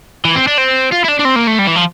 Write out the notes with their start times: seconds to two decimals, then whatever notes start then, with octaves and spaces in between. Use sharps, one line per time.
0.25 E3
0.35 C4
0.47 D4
0.58 C4
0.92 F4
1.04 E4
1.08 D4
1.19 D4
1.25 C4
1.36 A#3
1.47 A3
1.59 G3
1.67 E3
1.76 F3